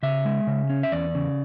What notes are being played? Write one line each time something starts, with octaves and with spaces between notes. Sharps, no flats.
C#3 E5
G#3
C#3
C#4
E5
E2 D5
C#3